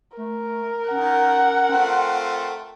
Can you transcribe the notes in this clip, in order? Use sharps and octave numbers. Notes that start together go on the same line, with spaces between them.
A3 A#4
D#3 C#4 F#5
A3 C4 F4 G5